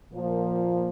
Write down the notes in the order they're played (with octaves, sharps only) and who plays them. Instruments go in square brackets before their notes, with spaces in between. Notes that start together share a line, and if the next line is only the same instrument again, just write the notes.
[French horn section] A#2 F3 A#3